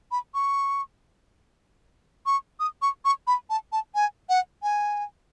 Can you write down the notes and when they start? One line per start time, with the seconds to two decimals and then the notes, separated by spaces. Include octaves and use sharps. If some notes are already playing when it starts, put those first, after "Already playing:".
0.11 B5
0.34 C#6
2.26 C#6
2.60 D#6
2.82 C#6
3.05 C#6
3.27 B5
3.50 A5
3.72 A5
3.95 G#5
4.29 F#5
4.63 G#5